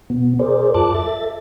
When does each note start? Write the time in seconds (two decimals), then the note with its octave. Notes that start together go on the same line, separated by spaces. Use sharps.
0.10 B2 B3
0.39 G#4 A#4 C5 D5
0.74 F#2 F4 A5 D6 F#6
0.94 A4 E5 A6